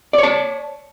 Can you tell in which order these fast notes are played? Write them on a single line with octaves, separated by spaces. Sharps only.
D5 C#5 A5